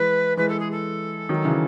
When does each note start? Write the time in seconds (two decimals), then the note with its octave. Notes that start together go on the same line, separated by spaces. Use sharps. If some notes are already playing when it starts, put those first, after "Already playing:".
Already playing: E3 G#3 B4
0.37 E3 G#3 B4
0.48 A4
0.59 G#4
0.71 A4
1.29 D#3 F#3
1.45 C#3 E3